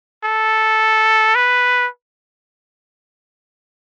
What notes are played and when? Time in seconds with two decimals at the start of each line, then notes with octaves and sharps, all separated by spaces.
0.24 A4
1.35 B4